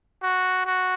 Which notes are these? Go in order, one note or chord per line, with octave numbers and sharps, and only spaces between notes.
F#4
F#4